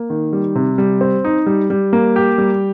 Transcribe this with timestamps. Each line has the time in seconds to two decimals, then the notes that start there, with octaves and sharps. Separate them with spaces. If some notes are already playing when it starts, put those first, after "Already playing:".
Already playing: A#3
0.10 D#3
0.33 G3
0.55 C3
0.78 G3
1.01 C4
1.25 D#4
1.46 G3
1.70 G3
1.93 A#3
2.16 G4
2.38 G3